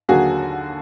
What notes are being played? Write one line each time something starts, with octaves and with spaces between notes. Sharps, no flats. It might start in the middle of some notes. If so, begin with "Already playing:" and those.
D#2 D3 F#3 A#3 F#4 G#4